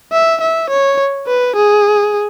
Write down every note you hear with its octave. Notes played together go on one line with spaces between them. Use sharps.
E5
E5
C#5
B4
G#4